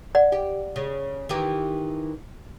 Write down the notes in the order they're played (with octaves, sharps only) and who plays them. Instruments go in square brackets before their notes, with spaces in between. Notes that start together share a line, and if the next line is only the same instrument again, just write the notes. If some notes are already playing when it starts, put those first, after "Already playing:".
[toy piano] D5 F#5
[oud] G4
C#3
D#3 E3 G4